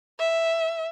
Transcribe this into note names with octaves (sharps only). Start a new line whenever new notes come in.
E5